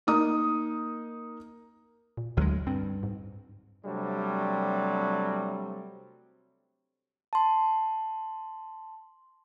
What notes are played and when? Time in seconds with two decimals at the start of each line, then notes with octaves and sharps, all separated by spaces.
0.07 A#3 D#4 D#6
2.17 A#2
2.37 D2 F#3 G#3
2.67 G2 C4
3.03 G#2
3.85 C3 F#3 G3 A3 C4 D4
7.33 A5 C6